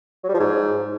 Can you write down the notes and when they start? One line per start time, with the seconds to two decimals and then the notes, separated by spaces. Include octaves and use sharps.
0.24 F#3
0.29 G3
0.34 F3
0.39 G#2